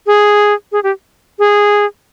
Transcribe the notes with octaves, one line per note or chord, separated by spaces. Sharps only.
G#4
G#4
G4
G#4